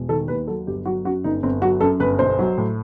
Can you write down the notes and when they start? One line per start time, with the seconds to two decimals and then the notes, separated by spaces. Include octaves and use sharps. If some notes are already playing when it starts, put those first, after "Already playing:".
Already playing: E1
0.09 D#3 A4
0.28 D#2 B4
0.47 F#3 A4
0.67 G1 G4
0.85 F#3 F#4
1.05 F#2 F#4
1.24 G1 D#4
1.43 G1 C4
1.62 F#3 F#4
1.81 F#2 A4
2.00 G1 B4
2.19 B1 C5
2.39 F#3
2.58 A2